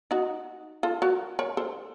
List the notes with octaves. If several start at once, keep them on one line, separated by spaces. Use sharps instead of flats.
D#4 F#4
F4 A4
F#4 A#4
A#4 C#5
A4 C5